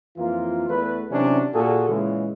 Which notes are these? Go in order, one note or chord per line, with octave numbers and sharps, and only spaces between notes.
F2 E3 A#3 F4
E2 A3 B4
C3 E3 F#3 C#4 D4
A#2 F#4 G#4 A4
A#2 C#3 E3 G#3